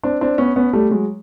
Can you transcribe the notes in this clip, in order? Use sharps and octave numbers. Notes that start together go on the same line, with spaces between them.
C4 D4
C4 D4
B3 C#4
B3 C#4
G3 A3
F#3 G#3